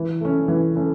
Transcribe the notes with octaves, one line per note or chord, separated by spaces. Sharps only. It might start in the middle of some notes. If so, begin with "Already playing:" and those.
Already playing: E3
A3 C#4
E3
A3 C#4